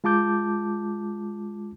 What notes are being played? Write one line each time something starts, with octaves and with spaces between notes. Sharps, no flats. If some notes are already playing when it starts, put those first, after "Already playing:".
G#3 F4 A5 D6 G6